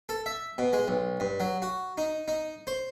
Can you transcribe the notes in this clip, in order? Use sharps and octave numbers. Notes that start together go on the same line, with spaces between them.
A4
E5
B2
G#3
B1
G2
F#3
F#4
D#4
D#4
C5